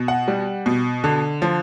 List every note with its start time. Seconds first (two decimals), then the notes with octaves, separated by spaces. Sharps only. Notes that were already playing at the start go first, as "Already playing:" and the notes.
Already playing: B2
0.08 F#5
0.28 G3
0.66 B2
1.04 D3
1.42 F3